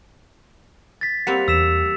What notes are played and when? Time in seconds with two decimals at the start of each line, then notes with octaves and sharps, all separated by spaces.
1.01 A6 B6
1.27 G3 A#3 C4 F#5 C#7 F7
1.48 E2 E6 B6 E7